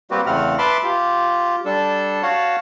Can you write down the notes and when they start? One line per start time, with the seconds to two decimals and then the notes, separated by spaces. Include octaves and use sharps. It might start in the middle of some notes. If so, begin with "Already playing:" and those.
0.11 G3 A#3 C4 F#4 G4 B4
0.26 E2 C#3 A3 C4 F#5 F6
0.58 B4 E5 A5 B5 C6 D6
0.83 F4 G4
1.65 G3 D4 A4
2.23 F#4 C#5 F5 F#5 A5